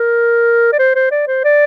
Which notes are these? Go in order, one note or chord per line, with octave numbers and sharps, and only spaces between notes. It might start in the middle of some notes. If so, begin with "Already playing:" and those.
Already playing: A#4
D5
C5
C5
D5
C5
D5